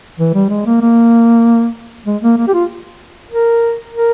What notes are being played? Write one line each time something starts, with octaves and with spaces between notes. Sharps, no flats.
E3
G3
G#3
A#3
A#3
G#3
A#3
A#3
G4
F4
A#4
A#4